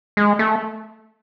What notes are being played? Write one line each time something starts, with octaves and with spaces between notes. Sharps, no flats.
G#3
A3